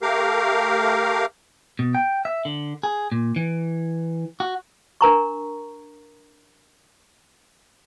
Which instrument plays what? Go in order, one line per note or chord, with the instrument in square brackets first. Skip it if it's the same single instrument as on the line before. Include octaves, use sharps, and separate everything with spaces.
[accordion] A3 G4 A#4 F5
[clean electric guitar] B2
G5
E5
D3
G#4
A#2
E3
F#4
[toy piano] D4 A#4 A#5 C#6